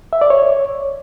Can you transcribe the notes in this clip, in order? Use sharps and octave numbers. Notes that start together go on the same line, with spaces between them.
E5
D5
C#5